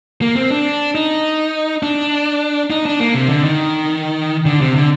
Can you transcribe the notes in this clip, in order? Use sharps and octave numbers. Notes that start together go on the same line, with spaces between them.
A#3
C4
D4
D#4
D4
D#4
D4
A#3
C3
D3
D#3
D3
C3
D3